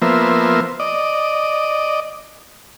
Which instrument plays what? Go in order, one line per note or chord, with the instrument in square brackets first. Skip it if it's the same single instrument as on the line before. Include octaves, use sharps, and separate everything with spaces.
[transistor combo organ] F3 A#3 B3 C5 E5
D5 D#5